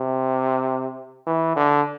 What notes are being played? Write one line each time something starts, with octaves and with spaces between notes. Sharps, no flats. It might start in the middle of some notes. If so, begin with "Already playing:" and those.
Already playing: C3
E3
D3